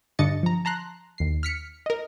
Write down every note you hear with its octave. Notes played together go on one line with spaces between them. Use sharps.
G2 D3 D4 D#5 A6 C#7
F3 A#5
A5 A#5 C6 F#6
D#2 C7
F6 B6 C#7
A#4 D#5